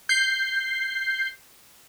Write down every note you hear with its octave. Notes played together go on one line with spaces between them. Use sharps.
G6 C7